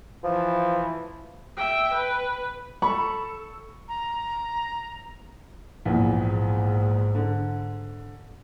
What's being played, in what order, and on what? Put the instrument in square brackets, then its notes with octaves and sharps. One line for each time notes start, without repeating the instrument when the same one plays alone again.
[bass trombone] E3 [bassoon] F3
[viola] E5 G5
B4
[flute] A4 [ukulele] B5 [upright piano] C#6
[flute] A#5
[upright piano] A#1 E2 [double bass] G#2
[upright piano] D3